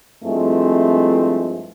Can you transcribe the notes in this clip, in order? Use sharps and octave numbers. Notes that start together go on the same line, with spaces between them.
G2 F3 G#3 A3 C4 E4